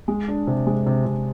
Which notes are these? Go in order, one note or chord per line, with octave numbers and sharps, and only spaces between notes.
G#3
D4
C3
G#3
C3
C3